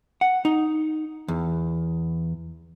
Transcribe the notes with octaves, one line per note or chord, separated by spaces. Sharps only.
F#5
D#4
E2